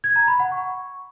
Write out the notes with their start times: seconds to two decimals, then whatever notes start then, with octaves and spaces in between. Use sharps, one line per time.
0.04 G#6
0.16 A#5
0.28 B5
0.40 F#5
0.52 C#6